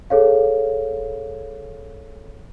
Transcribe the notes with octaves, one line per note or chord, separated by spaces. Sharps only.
G#4 A4 C#5 F5